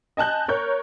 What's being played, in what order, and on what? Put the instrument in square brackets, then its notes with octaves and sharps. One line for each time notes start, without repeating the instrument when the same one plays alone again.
[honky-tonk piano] D#5 G#5 A5 F#6 G6
A#4 C#5 G6